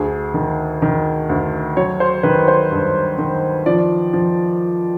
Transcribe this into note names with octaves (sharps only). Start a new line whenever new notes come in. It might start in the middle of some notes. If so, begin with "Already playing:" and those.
Already playing: D2 G#4
D#3
D#3
D2
F#3 C#5
C5
D#3 B4
C5
G2
D#3
F3 D5
F3